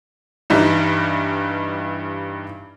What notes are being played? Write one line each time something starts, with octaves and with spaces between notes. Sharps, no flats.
G2 E3 G3 D4 D#4